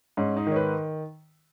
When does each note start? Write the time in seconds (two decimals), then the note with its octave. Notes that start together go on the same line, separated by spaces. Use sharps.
0.17 G#2 C#4
0.37 D#4
0.47 D#3 C#5
0.56 B4